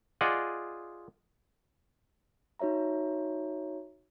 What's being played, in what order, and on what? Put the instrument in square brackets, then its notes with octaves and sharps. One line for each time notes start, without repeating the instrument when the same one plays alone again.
[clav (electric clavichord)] F4 G#4 D5 D#5 F#5
[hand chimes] D#4 F#4 C#5 E5 A#5